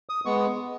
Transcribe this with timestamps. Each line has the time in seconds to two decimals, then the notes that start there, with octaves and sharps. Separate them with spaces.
0.09 D#6
0.25 G#3 B3 C#6